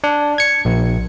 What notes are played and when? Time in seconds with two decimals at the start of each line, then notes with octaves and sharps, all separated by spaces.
0.04 D4
0.38 G#6 C#7
0.65 A#1